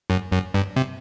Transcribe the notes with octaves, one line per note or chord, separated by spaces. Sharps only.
F#2
F#2
G2
C3